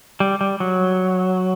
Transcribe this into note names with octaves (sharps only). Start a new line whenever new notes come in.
G3
G3
F#3